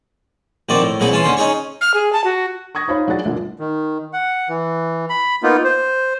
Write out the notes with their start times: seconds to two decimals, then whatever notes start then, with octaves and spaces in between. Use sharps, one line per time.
0.69 A#1 D#3 C4 F#4 D5
0.82 A2
1.00 C2 A#2 F#3 G#4 B5
1.11 E3 C#4 A5 C6
1.24 D#2 D3 C#4 C6
1.37 C#4 D#4 G#4 C#5 C#6
1.81 F6
1.94 G#4
2.13 A5
2.24 F#4
2.75 C#6 D#6 G#6 A#6
2.88 D#4 F4 C5 C#5 F5 B5
3.08 F#3 D4 G#4 F#5 A6
3.25 C2 A#2 D3
3.59 D#3
4.13 F#5
4.49 E3
5.09 B5
5.43 A#3 B3 D#4 F4
5.64 C5